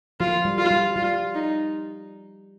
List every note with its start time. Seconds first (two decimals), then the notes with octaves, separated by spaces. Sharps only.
0.20 F3 F4
0.45 G3
0.58 F4
0.71 G3
0.96 G3 F4
1.35 D#4